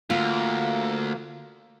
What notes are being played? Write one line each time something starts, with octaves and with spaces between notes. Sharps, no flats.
D2 A#3 F4